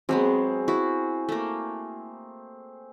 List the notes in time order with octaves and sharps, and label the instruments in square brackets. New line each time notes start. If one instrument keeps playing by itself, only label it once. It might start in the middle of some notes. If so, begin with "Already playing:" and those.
[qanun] F#3 G#3 B3 [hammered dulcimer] C4 G#4
[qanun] E4 F#4
A3 A#3